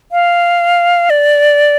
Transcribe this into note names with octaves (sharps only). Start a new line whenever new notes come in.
F5
D5